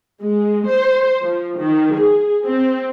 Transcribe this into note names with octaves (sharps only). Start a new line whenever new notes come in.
G#3
C5
F3
D#3
G#4
C4